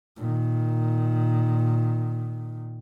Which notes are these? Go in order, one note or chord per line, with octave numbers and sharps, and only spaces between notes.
A#2 D#3